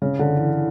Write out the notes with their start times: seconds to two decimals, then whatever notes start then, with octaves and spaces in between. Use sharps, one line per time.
0.02 C#3
0.19 D3
0.36 E3